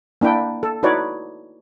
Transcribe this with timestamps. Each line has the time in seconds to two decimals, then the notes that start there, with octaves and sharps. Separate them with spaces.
0.21 A#3 D4 E4 G5
0.63 A4
0.83 D#4 E4 F#4 B4 C#5 D5